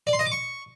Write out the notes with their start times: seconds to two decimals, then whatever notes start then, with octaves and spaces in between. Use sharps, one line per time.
0.07 D5
0.13 C6
0.19 D#5
0.25 D6
0.32 C#6